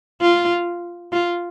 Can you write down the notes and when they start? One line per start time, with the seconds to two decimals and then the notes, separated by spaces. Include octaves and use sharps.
0.21 F4
1.12 F4